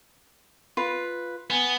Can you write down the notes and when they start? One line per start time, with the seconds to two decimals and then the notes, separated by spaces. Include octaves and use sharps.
0.77 F4 B4
1.50 B3 G#5